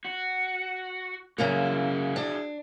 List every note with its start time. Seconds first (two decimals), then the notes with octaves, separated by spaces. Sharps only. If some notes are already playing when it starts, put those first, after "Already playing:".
0.05 F#4
1.38 F#2 C#3 A#3 F#4 G#4 E5
2.16 D4